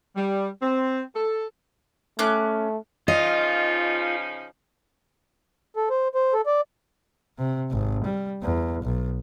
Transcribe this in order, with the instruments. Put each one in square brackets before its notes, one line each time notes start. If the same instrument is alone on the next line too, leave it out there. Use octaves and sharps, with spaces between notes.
[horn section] G3
C4
A4
[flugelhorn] A3 [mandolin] C#4 D6 F#6
[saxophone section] C#3 F3 D#4 [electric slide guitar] F4 [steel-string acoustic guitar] D#5
[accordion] A4
C5
C5
A4
D5
[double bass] C3
G#1
G3
E2
B1